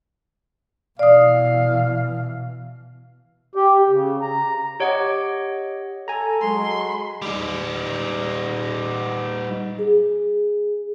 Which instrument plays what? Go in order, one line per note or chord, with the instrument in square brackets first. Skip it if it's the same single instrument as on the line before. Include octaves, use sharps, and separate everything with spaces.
[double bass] B2 E3 [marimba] D5 D#6 [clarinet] F5
[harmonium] G4
C#3
A#5
[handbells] G4 C#5 D#5 F#5
[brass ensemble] A4 [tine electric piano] G#5 A#5
[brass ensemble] F#3 G#3 [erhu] C6
[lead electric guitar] G3 D#4
[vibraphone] G#4